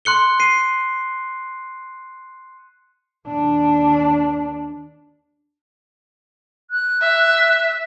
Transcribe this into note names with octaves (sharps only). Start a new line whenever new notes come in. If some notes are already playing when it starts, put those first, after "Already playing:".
C6 F#6 C#7 G7
C7 D#7
D#2 D4
F#6
E5